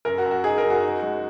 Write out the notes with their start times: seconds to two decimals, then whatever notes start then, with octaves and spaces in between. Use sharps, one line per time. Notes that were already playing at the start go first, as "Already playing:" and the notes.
0.05 F#2 A#4
0.18 F#4
0.25 F#2
0.31 F#4
0.44 D#4 G#4
0.58 A#4
0.64 F#2
0.70 F#4
0.83 D#4
1.03 G#3